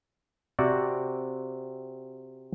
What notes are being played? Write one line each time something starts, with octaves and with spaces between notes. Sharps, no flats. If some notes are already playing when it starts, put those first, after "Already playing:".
C3 C4 F#4 D5